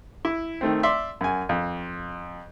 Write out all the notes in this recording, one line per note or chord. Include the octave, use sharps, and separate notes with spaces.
E4
D#3 A3 C4
D5 E5 C6
F#2 G#5
F2